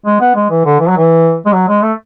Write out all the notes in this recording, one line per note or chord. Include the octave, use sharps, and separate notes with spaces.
G#3
B3
G#3
E3
D3
E3
F#3
E3
G#3
F#3
G#3
A3